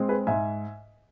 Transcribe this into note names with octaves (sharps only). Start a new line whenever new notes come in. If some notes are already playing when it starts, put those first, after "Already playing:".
Already playing: G#3 C4
G#4 B4
G#2 E5 G#5